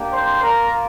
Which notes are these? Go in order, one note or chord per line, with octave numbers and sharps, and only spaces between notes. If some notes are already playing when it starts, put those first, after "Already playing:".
Already playing: A#3 D4 G4
C5
A#3 F4 A#4